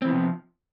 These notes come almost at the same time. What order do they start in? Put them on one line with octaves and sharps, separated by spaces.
C4 E3 B3 C3 F3